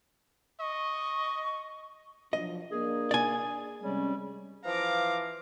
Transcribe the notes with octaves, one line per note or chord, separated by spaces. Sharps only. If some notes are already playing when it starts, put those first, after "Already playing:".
D#5 C#6
F3 F#3 D4 D#5
A#3 D4 G#4
D5 G#5
C3 G3 G#3 C#4
E3 F3 F5 A#5 D6